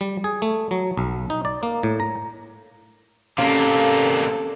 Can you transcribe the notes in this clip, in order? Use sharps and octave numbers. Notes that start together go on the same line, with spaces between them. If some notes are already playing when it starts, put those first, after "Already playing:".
G3
G#4
A3
F#3
B1
D#4
D5
A#3
A2
A#5
C3 A#3 C#4 A4 F5